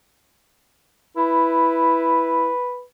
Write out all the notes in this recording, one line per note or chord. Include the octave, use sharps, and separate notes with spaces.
E4 B4